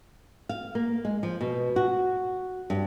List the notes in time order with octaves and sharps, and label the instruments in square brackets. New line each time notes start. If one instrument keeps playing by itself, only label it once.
[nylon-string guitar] F5
A#3
G#3
F3
B2
F#4
G2